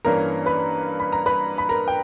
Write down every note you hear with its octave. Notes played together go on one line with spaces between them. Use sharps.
G2 E3 A#3 C#4 A#4 A#5
B4 B5
B5
A#5
B4 B5
B5
A#4 A#5
G5